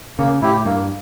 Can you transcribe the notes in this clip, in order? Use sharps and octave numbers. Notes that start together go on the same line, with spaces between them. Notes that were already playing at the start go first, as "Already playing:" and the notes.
C#3 A#3
A2 E4 G4
G2 A#3